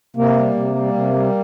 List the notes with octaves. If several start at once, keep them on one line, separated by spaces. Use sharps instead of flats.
C3 A#3
G3
C3
G3
C3
G3